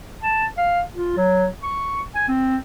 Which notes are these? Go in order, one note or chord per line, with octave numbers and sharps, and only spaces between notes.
A5
F5
F4
F#3
C#6
G#5
C4